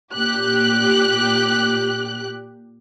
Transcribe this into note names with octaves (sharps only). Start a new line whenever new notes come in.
A#2 G4 F#6